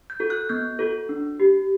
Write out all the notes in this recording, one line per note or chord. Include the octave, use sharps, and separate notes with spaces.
G6
F#4 A4
F#6
B3 G6
F#4 A4
D4
G4